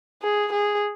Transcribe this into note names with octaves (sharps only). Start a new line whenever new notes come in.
G#4
G#4